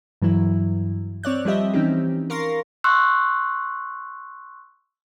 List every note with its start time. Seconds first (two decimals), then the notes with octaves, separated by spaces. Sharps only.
0.22 G2 E3 F#3 E4
1.23 C4 C#5 D5 F#6
1.45 F3 G3 C4 G4 D#5 E5
1.74 E3 C4 C#4 D#4 G4
2.30 A#4 F5 C6 C#6 A#6
2.84 C6 C#6 E6 F#6